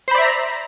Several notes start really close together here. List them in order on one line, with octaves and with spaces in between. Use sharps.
C5 B5 D5 E5 A#5